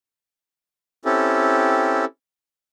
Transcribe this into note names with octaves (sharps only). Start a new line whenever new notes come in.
C4 C#4 E4 G4 A4